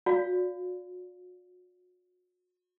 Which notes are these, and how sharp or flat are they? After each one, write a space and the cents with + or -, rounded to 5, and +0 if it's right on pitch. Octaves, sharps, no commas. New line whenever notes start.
F#4 -40 D5 -35 F5 +0